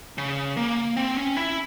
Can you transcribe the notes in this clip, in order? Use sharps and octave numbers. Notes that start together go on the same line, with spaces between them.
C#3
A#3
C4
C#4
E4